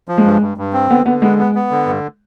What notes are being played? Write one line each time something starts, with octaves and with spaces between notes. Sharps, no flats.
F3
G#3
G2
G2
G2
C4
D3 B3
D3 B3
G#3 B3
B3
B3
D3
G2